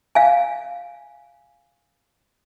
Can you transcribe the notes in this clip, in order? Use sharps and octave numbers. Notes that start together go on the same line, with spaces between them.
F5 G#5